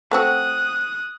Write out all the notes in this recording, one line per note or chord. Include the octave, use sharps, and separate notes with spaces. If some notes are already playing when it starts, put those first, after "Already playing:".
A3 C4 F#4 D#6 F#6